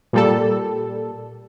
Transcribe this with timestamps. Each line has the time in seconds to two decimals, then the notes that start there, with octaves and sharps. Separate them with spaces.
0.13 A#2 G3 A4